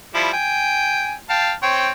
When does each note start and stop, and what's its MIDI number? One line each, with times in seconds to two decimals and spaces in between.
0.15 0.30 53
0.15 0.30 55
0.15 0.30 64
0.33 1.14 79
0.33 1.14 80
1.30 1.53 77
1.30 1.53 79
1.30 1.53 81
1.63 1.90 60
1.63 1.90 73
1.63 1.90 79